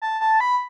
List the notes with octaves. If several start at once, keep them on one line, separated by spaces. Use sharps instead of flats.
A5
A5
B5